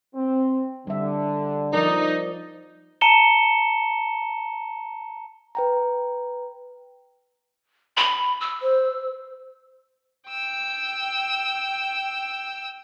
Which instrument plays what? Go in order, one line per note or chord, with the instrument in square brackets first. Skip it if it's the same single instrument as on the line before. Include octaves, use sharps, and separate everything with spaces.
[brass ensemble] C4
[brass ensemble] D3 [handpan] G3 E5
[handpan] F3 A#4 D5 [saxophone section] D#4
[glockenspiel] A5 A#5 C#7 E7 G7
[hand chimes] B4 G5 A#5
[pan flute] B5
E6
[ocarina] C5
[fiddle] G5 E6